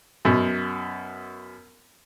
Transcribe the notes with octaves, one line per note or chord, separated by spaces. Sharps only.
F#2 B2